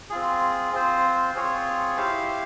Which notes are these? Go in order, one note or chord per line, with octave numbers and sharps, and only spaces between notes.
C4 F4 G#4
C4 F4 C5
C4 F4 G#4 C#5
E4 G4 C5 F5